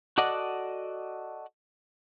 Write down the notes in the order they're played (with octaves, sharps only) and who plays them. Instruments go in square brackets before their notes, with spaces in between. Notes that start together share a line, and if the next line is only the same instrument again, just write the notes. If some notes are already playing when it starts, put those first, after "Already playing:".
[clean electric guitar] F#4 A4 D5 D#5 F#5